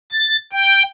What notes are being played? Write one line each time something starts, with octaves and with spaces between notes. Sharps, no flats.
A6
G5